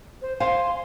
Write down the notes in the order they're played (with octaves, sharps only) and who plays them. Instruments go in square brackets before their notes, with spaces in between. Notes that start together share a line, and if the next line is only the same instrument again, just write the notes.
[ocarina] C5
[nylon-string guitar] C5 F5 G#5 [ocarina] C6